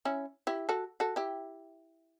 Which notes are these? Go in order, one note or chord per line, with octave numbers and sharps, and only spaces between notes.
C#4 E4
E4 G4
F#4 A4
F#4 A4
E4 G4